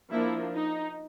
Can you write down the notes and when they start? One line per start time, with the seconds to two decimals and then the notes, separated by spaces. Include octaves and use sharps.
0.11 F3 A#3 D4 E4
0.55 D#4